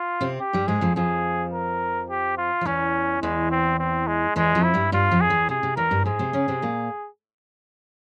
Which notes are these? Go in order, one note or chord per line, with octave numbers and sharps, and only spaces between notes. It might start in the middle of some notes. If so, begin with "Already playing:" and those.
Already playing: F4
C3 C4
G4
G2 G3
G#2 G#3 G#4
F2 F3
F2 F3 G#4
A#4
G4
F4
F3
E2 E3 C#4
E2 E3 G#3
C4
C4
G#3
E2 E3 G#3
F2 F3
E4
G2 G3
G2 G3 F4
F2 F3
G#4
E2 E3
C3 G#4
C3
E2 E3 A#4
G2 G3
G#2 G#3 G#4
C3 C4
C#3 C#4
C3 C4
A#2 A#3